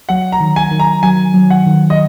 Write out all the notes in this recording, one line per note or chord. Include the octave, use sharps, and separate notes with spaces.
F#3 F#5
A#5
D#3
G#5
D#3
A#5
F#3 G#5
F#3
F#5
D#3
D#5